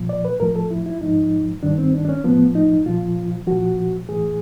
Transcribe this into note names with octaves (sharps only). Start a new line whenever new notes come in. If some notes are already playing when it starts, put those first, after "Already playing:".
Already playing: A#2 F3
D5
B4
A2 F3 A#4
A4
E4
E4
G#2 F3 D#4
G2 D#3 D4
C4
D4
D4
C#4
A2 F3 B3
D#4
A#2 F3 F4
A#2 F3 F#4
A2 E3 G#4